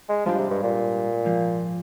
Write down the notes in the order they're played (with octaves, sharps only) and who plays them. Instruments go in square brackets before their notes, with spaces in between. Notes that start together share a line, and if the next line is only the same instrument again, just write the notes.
[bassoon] G#3
[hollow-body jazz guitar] G#2 G3 D4 G4 [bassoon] F3
[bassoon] C3
G2
A#2
[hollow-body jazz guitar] G#2 F3 A#3